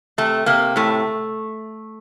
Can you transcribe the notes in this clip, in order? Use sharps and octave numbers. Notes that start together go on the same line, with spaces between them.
C3 A3
C3 A#3
A2 A3